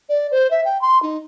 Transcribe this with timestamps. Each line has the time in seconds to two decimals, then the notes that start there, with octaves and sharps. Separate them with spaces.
0.09 D5
0.31 C5
0.50 E5
0.64 G5
0.81 C6
1.02 D#4